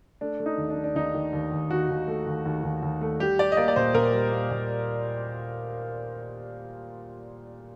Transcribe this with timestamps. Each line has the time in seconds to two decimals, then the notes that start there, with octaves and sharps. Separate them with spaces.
0.21 A3 D4
0.40 A3
0.46 D#4
0.58 D#2
0.70 D4
0.77 A3
0.84 D4
0.95 D#2 D#4
1.14 D#3
1.33 D#2
1.52 D#2
1.70 D#2 F#4
1.89 D#2
2.08 A3
2.27 D#2
2.45 D#2
2.63 D#2
2.83 D#2
3.01 A3
3.19 G3 G4
3.38 G3 D5
3.52 D#5
3.57 A#3 D5
3.68 D5
3.76 A#2 C5
3.94 A#2 A#4
4.13 G3
4.32 A#3
4.51 A#2